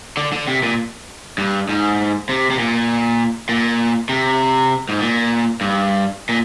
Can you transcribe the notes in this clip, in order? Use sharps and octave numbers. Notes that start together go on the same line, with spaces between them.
D3
D3
C3
A#2
G2
G#2
C3
C3
A#2
A#2
C3
G#2
A#2
G2
A#2